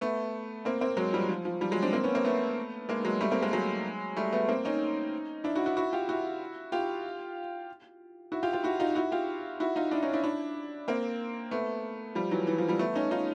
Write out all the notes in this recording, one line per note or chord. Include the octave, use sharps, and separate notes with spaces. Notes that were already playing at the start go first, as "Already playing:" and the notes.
A3 B3
A#3 C4
A#3 C4
F#3 G#3
F3 G3
F3
F3
F3 G3
F#3 G#3
C4 D4
A#3 C4
B3 C#4
A#3 C4
A3 B3
G#3 A#3
F#3 G#3
G3 A3
A#3 C4
G#3 A#3
F#3 G#3
G3 A3
A3 B3
A#3 C4
C#4 D#4
D4 E4
E4 F#4
E4 F#4
E4 F#4
F4 G4
E4 F#4
F4 G4
E4 F#4
F4 G4
F4 G4
E4 F#4
D#4 F4
E4 F#4
F4 G4
E4 F#4
D#4 F4
D4 E4
C#4 D#4
D4 E4
D4 E4
A#3 C4
A3 B3
F3 G3
E3 F#3
E3
F3
F3 G3
A3 B3
C#4 D#4
D#4 F4